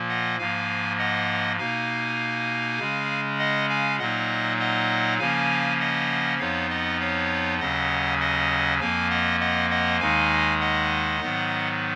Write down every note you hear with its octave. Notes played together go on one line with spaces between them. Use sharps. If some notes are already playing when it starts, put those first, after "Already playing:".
Already playing: A#2 F3 A#3
D#5 F#5
G#2 F3 A#3 F5 G#5
D#5 F#5
B2 A#3 D#4 F5 G#5
C#3 G#3 C#4
D#5 F#5
F5 G#5
A#2 F#3 A#3 D#4 D#5 F#5
D#5 F#5
C#3 F3 A#3 C#4 F5 G#5
D#5 F#5
F2 F3 B3 D#4 C#5 F5
D#5 F#5
C#5 F5
D#2 C#3 F#3 C#4 D#5 F#5
D#5 F#5
F2 F3 A#3 F5 G#5
D#5 F#5
D#5 F#5
D#5 F#5
D#2 D#3 G#3 D#4 F5 G#5
D#5 F#5
G#2 D#3 F#3 B3 D#4